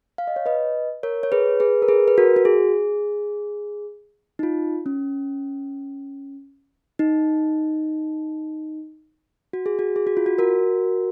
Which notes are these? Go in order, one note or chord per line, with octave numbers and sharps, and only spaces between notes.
F5
D#5
C#5
B4 D#5
A#4 C#5
C#5
G#4 B4
G#4 B4
A#4
G#4 B4
B4
F#4 A#4
F#4
G#4
D#4
F4
C#4
D#4
F#4
G#4
F#4
G#4
F#4
F4
F#4
F#4 A#4